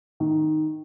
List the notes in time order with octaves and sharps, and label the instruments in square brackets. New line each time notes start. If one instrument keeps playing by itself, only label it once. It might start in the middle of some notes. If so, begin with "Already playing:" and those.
[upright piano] D#3